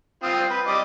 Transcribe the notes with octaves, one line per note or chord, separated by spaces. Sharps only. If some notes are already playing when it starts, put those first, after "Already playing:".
C4 F4 D#6
B4
G3 D#5 D6